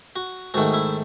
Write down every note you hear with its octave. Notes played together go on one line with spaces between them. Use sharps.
F#4
G#2 D#3 A3 F#4
E4